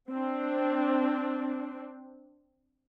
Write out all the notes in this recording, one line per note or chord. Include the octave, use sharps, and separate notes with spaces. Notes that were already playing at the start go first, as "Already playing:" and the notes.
C4 D4